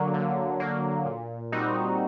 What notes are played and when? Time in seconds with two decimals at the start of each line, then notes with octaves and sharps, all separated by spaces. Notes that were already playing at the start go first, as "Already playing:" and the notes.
Already playing: D3 F#3 A#3
0.14 D3
0.60 F#3 A#3
1.06 A#2
1.52 G3 C4 D#4 F#4